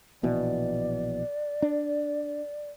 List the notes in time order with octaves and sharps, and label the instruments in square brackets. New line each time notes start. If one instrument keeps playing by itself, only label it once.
[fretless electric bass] A#1 B2 E3 [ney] D5
[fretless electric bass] D4